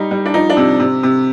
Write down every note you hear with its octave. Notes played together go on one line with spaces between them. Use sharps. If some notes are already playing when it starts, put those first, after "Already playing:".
Already playing: G3 D#4
G3
D4
F3 D#4
D4
C3
C3
C3